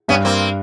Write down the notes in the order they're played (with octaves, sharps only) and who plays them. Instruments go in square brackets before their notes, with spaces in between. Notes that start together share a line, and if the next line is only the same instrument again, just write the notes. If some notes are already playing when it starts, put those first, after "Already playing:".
[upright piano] G2 [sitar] B3 C#4
[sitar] A#3 C4